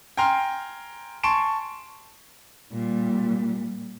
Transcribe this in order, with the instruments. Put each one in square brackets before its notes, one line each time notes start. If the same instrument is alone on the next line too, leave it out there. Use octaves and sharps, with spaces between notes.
[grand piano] G5 G#5 A#5 C6 F6
G#5 A5 C6 C#6 D7 E7
[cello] A#2 G3